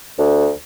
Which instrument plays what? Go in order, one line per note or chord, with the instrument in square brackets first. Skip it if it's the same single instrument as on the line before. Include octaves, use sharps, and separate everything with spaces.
[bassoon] D2